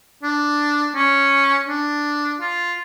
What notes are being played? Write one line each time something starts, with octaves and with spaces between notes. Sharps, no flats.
D4
C#4
D4
F4